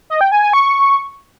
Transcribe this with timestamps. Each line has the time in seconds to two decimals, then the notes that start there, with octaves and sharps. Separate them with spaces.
0.10 D#5
0.21 G5
0.32 G#5
0.43 G#5
0.53 C#6